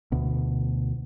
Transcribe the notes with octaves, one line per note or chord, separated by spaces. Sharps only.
D2 B2